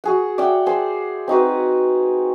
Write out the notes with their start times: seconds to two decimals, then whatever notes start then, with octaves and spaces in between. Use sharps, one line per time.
0.04 F#4 G#4 F#5
0.38 D5 E5 F#5 G5
0.66 G#4 C5
1.28 C4 D#4 F#4 B4